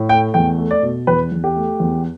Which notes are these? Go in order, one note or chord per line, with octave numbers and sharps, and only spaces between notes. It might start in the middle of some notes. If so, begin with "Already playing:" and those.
Already playing: A2
A3 G5
E2 G5
A3
D5
B2
E2 B4
E2
G4
A3
E2